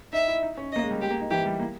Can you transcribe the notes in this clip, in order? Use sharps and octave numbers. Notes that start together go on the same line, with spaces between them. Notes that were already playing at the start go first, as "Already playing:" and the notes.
D#4 E5
E4
D#4
C#4
A#3 D#5
G#3
G3
G#3 G4
A#3
D#4
E3 G4
G3
A#3